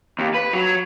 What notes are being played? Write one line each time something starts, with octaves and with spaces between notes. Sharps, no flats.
D#2
B4
F#3